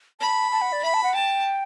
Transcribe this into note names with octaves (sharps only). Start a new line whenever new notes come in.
A5 B5
A5
F#5
D5
E5 B5
A5
F#5
G5 A5